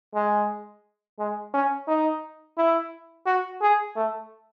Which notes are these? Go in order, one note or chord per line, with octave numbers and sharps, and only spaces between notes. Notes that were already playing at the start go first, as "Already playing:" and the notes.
G#3
G#3
C#4
D#4
E4
F#4
G#4
A3